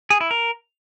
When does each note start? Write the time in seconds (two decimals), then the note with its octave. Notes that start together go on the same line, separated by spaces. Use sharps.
0.10 G#4
0.21 E4
0.31 A#4